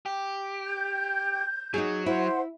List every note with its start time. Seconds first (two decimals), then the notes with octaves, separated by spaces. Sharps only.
0.06 G4
0.65 G6
1.74 F#3 D#4 F#4 G#4
2.06 E4 C5 F#5